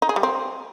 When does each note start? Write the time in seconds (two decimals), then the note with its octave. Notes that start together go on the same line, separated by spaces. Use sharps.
0.02 D#4
0.09 G#4
0.16 G3
0.23 C4